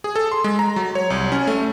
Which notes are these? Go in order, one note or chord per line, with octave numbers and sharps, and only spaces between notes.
G#4
A4
C6
G#3
A#5
F#3
C#5
C2
C#4
A3